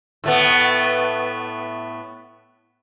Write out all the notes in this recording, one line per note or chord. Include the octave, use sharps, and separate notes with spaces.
A2 A3 B3